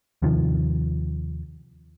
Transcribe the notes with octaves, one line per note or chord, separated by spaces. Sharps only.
D#2 C3 D#3 F3